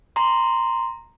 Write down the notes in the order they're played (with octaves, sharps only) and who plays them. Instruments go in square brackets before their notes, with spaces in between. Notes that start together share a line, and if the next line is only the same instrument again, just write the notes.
[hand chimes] A#5 C6